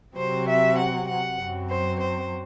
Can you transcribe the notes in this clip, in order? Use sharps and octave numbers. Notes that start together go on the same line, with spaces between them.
C3 F#3 C4 C5
E5
F#5
F#5
F#2 F#3 C4
C5
C5